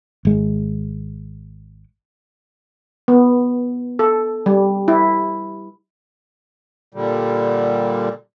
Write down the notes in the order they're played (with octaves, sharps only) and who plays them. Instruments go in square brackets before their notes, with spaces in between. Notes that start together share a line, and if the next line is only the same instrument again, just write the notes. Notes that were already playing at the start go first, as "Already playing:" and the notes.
[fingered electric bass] G#1 G#3
[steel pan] B3
A4
G3
E4
[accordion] A#2 D3 G3